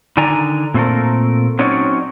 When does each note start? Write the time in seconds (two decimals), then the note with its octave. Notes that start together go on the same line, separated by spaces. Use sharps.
0.17 D3 D#3 D#4 D5 G#5 A#5
0.74 A#2 A3 C4 F4 A4 A#4
1.59 F#3 C4 C#4 D#4 C#5 D5